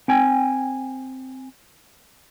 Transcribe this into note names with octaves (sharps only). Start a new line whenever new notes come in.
C4 G5 G#5